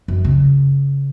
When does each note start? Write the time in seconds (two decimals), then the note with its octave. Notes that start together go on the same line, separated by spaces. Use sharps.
0.08 F#2
0.24 C#3